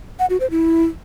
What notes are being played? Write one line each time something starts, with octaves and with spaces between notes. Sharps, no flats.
F#5
F#4
C5
E4